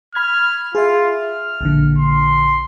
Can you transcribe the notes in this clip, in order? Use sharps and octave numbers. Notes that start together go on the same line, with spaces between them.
B5 F6 G#6
F4 G#4 E5
F6
A#1 A#2 D3
C6